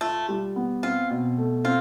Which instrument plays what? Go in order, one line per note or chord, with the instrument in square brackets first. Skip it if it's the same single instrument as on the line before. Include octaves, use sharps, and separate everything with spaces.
[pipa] A3 [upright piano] F4
[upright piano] G3
B3
[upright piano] C4 [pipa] F4
[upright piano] B2
A3
[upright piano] C4 [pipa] F4